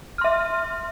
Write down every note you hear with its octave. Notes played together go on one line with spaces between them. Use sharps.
E5 C6 F6